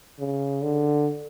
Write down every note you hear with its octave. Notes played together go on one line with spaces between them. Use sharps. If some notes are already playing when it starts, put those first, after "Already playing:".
C#3
D3